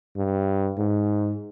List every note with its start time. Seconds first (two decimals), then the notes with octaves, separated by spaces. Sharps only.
0.17 G2
0.78 G#2